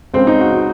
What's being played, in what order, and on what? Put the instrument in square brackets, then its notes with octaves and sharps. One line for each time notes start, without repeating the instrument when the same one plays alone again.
[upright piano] C#2 C#3 C4
D#4
F#4
F#4